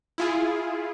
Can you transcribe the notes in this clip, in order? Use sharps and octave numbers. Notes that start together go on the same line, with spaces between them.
E4 F4 G#4